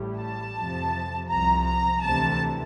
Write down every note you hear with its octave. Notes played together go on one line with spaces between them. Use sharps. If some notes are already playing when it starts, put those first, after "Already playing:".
Already playing: A1 A2 G3
A5
F2 C3 F3
C2 C3 F3 A#5
A#5
D2 C3 E3 A5